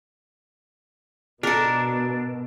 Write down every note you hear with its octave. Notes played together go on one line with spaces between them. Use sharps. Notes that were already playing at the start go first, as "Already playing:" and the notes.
B2 D4 A4 A#4